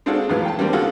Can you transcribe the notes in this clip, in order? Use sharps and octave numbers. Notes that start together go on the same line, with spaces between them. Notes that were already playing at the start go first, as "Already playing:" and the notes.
G#3 C4 D4 F4 F#4 A4
E2 A2 F#3 B3 F5
G5 A5
G3 A#3 C4
D3 G#3 F4 F#4 A4